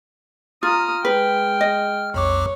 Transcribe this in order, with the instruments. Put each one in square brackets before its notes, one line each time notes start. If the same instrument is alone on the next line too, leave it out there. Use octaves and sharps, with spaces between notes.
[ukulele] F4 [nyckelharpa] A#5 D#6 [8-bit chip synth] F6
[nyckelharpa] G#3 G5 [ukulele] B4
[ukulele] D#5
[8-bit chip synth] B1 F2 D6 [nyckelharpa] C#5